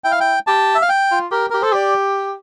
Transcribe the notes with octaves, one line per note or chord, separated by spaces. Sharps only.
E4 G5
F5
G5
G4 A5
E5
F5
G5
F4
G4 A#4
G4 A#4
A4 C5
G4 D5